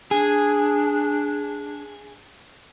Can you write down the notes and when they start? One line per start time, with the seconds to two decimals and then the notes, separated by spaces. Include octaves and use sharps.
0.11 D4 G#4